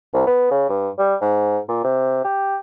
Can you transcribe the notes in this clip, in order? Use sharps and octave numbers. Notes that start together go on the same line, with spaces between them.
C2
B3
C#3
G2
G3
G#2
A#2
C3
G4